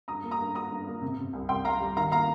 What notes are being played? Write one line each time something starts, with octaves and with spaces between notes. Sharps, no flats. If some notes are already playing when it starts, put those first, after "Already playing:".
G2 A#5 D#6
A#3
A#5 D#6
G2
A#3 A#5 D#6
G2
A#3
C3
C3
C2
C2 G5 C6
C2 F5 A#5
G3
D#3 F5 A#5
A#3 F5 A#5